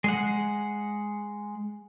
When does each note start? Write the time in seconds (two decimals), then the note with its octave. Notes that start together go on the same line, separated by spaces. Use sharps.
0.04 G#3 F#5